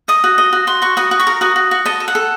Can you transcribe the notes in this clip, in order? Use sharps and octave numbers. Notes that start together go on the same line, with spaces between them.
D#5 D#6
F#4
D#5
F#4
F#4 C6
F#4 C#6
F#4 D#6
F#4
C#6
A#4
F#4 D#6
F#4
F#4
D#5 A5
A4
F#5
A4